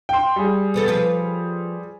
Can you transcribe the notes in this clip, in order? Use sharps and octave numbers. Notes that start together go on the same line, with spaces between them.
G5 C6
G3 G#4
E2 B3 A4
F3 B4